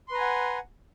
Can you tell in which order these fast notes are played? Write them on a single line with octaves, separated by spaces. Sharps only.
C6 B4 A#5 G#5 F#5